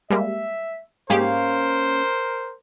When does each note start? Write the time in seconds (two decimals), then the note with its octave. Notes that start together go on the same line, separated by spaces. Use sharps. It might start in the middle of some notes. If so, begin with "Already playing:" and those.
0.10 G3 G#3 A#3 E5
1.10 G#2 A#3 C#4 G4 G#4 A#4 C5 F5